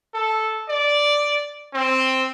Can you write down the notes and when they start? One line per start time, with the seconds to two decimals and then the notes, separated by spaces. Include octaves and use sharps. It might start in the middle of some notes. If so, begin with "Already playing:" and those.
0.14 A4
0.69 D5
1.73 C4